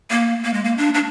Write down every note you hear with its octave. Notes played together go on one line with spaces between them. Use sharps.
A#3
A#3
G#3
A#3
D4
D4